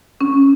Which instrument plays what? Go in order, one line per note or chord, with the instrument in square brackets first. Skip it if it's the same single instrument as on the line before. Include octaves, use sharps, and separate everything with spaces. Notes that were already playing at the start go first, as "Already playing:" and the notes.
[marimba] C#4